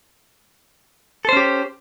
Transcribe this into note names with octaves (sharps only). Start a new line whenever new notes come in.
C#4 G4 A4 C5